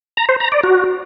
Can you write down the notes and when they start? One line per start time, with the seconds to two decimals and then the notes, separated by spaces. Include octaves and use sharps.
0.17 A#5
0.29 C5
0.40 A#5
0.52 D5
0.63 F#4